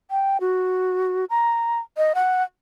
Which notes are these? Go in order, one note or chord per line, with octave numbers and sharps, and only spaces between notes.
G5
F#4
A#5
D#5
F#5